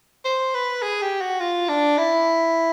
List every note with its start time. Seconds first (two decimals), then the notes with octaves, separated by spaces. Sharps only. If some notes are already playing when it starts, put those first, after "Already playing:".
0.25 C5
0.54 B4
0.82 G#4
1.02 G4
1.21 F#4
1.40 F4
1.69 D4
1.98 E4